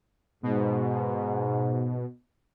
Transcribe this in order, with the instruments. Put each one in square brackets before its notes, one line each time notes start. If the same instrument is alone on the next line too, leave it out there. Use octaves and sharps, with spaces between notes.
[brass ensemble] G#2 [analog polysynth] B2